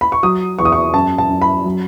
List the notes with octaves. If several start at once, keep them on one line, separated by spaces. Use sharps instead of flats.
B5
C#6
F#3 D#6
E2 C#6
D#6
C#6
F#2 A5
A5
F#2
B5
F#3